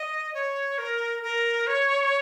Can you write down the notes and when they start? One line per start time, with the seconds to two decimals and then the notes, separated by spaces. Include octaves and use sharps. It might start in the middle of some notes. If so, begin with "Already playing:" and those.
Already playing: D#5
0.34 C#5
0.78 A#4
1.23 A#4
1.67 C#5